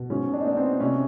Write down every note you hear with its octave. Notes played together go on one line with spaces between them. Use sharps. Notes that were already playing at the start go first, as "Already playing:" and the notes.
Already playing: B2
G#2 C#4
D4
D#4
B3 D4
C4
C3 C#4